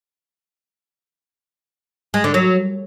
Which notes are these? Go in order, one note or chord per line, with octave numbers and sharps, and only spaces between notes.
G#3
D3
F#3